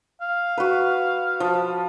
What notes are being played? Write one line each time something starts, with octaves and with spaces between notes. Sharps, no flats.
F5
F#4 B4
F3